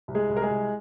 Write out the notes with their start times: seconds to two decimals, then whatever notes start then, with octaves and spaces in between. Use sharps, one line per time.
0.08 C2
0.15 G#3 G#4
0.29 C2
0.37 A#4
0.42 G#3 G#4
0.50 C2